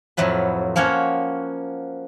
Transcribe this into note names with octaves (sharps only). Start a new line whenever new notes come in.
F2 A2 F#3 B4
F3 A#3 C#4 F#4 C#5